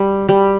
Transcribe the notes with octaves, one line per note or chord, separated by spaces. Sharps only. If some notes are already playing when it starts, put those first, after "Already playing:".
Already playing: G3
G3